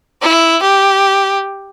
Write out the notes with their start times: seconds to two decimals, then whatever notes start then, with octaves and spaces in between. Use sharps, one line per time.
0.22 E4
0.63 G4